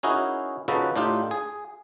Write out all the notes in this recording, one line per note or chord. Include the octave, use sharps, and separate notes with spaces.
C#4 D#4 E4 F#4 G#4 A#4
C#3 F3 D#4 F#4 A4 B4
A2 D4 D#4 F4 G4
G#4